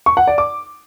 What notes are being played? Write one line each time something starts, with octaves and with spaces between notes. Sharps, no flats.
C#6
F#5
D5
D6